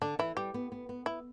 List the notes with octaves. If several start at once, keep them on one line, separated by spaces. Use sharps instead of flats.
D3 D4
E3 E4
G3 G4
B3
B3
B3
B3 E4